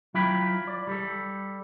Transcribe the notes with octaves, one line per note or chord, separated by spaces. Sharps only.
F#3 E4 F4 G5 B5
D5
G3 A4